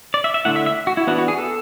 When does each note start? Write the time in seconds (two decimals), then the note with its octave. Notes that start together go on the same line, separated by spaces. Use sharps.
0.14 D5
0.24 E5
0.34 E5
0.45 D3 A3 E4 F#5
0.56 E5
0.66 E5
0.87 F#4
0.97 E4
1.07 E3 B3 D4 F#4
1.18 F#4
1.28 G#4
1.38 A4